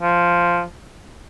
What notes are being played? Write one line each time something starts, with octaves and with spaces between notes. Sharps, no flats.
F3